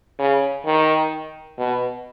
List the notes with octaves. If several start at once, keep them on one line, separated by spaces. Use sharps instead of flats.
C#3
D#3
B2